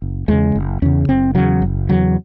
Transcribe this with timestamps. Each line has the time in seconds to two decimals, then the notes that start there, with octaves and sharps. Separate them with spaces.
0.02 F#1
0.28 E2 C#3 G#3
0.55 F#1
0.82 E2 C#3 C#4
1.09 F#1 C4
1.35 E2 C#3 F#3
1.62 F#1
1.89 E2 C#3 F#3